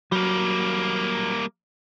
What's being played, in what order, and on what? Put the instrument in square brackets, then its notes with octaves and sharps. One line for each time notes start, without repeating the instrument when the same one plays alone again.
[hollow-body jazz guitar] F#3 [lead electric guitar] G3 A#3